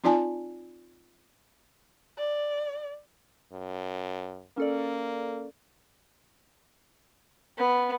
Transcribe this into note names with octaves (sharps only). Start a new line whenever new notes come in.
C4 D#4 F4 D5 G#5 A5
D5
F#2
A#3 C#4 A4 D5
B3